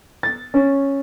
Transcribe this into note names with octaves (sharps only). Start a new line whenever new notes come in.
A6
C#4